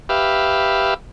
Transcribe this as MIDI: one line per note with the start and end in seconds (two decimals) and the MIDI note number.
0.09 0.94 67
0.09 0.94 71
0.09 0.94 76
0.09 0.94 77